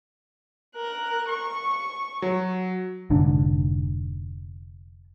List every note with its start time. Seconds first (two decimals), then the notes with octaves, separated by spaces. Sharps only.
0.76 A#4 F#6
1.28 C#6
2.22 F#3
3.10 F1 G#2 D3 D4